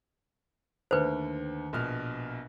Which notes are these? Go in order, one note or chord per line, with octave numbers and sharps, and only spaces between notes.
D#2 D3 A3 B4 C5
A#1 B2 F6